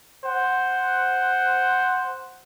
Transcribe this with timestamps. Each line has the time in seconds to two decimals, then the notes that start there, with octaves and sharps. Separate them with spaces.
0.25 C5 F#5